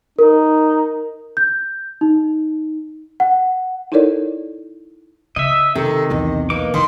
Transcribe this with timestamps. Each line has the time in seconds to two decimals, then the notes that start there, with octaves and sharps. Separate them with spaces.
0.19 D#4 A#4
1.37 G6
2.01 D#4
3.20 F#5
3.92 D#4 E4 A4 A#4 C#5 D5
5.36 C#3 D#5 E5
5.75 C3 D#3 A4
6.10 B1 E2 D#5
6.50 A#3 D#4 B4 D6
6.74 B1 D#3 E3 C6